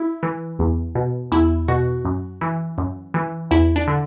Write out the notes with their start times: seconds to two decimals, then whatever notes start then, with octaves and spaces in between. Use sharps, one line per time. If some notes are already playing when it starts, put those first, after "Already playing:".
Already playing: E4
0.23 E3
0.59 E2
0.95 B2
1.32 E2 E4
1.68 B2 F#4
2.05 F#2
2.41 E3
2.78 F#2
3.14 E3
3.51 E2 E4
3.76 D4
3.87 D3